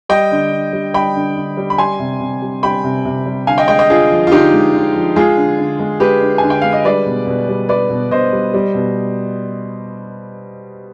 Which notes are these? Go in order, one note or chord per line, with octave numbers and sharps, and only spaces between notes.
G3 D#5 G5
D3
D3
G3
G3 G5 B5
D3
D3
G3
B5
G3 G#5 C6
C3
C3
G3
G3 G5 B5
C3
C3
G3
D3 F5 G#5
D#5 G5
G#3 D#5 G5
D#5 G5
D3 F4 G#4
F3
F4
D3 D#4 G4
G#3
D3
F3
G#3 F4 G#4
D3
D3
G#3
G#3 G4 B4
D3
D3 G#5
G5
G#3 F5
D#5
G3 B4 D5
B2
B2
G3
G3 B4 D5
B2
B2 C5 D#5
G3
G3
B2